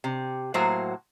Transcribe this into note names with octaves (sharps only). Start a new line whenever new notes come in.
C3
A2 F#3 A#3 F#4 C5